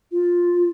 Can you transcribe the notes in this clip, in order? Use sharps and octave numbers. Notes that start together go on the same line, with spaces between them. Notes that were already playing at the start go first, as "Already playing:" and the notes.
F4